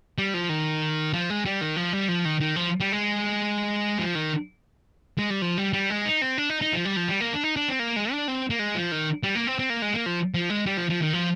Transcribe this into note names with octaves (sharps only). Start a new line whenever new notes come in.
G3
F3
D#3
F3
G#3
G3
D#3
F3
G3
F3
D#3
D#3
F3
G3
G#3
F3
D#3
G#3
G3
F3
G3
G3
G#3
D#4
C4
D4
D#4
D#4
F3
G3
F3
G3
A#3
D4
D#4
D4
C4
A#3
G#3
D4
C4
A#3
G#3
F3
D#3
G3
A#3
C4
C4
A#3
G#3
A#3
F3
F3
G#3
G3
F3
F3
D#3
F3